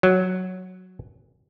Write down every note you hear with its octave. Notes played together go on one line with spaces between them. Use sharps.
F#3